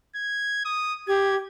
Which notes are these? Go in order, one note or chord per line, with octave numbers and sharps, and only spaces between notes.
G#6
D#6
G4 G#6